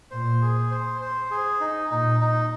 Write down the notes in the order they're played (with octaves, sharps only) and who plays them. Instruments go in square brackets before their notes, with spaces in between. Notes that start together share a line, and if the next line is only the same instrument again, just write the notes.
[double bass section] A#2 [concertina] C5
[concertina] G#4
C5
C5
G#4
D#4
[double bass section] A#2 [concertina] D#4
[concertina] D#4